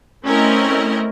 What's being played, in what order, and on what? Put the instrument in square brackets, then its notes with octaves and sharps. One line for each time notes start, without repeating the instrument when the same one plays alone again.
[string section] A3 C4 C#4 E4 A#4 D#5